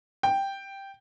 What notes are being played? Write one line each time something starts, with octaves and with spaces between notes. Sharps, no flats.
G5